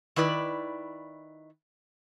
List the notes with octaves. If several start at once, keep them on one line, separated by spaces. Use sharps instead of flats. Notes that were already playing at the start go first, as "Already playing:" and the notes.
D#3 E4 B4 D5